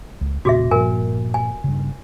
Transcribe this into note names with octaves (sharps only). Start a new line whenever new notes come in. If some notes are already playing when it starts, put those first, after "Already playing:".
C#2
E1 A#2 C#3 F#4 G#4 E5
G2 A#2 F3 A#4 G#5
G#5
G2 C#3